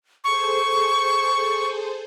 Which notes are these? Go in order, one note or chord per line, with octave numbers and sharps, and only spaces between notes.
G#4 A4 C5 C#6